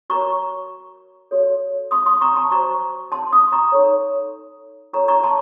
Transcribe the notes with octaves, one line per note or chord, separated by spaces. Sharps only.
F#4 A#4 C#5 A#5 C#6
F#4 A4 C#5
C6 D#6
C6 D#6
A#5 C#6
A5 C6
F#4 C5 A#5 C#6
A5 C6
C6 D#6
A#5 C#6
D#4 A4 C#5
F4 A4 C#5 A#5 C#6
A#5 C#6
A5 C6